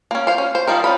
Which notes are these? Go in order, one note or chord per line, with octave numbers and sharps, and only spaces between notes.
A#3 C#4
C5 F5
C#4
C5
F3 G3 D#4 A#4
C#4 F4 B5